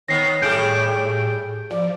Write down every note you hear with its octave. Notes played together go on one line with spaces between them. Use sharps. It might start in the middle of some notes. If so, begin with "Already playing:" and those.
D#3 B3 C#5 A#6 C7
A2 G3 A3 G#4 G6 D7
F3 D5